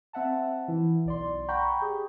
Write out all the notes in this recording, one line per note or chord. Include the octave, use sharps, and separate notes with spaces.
C4 E5 F#5 A5
E3 E4
B1 D5 C6
F#5 G5 A#5 B5 C#6 G6
G4 G#4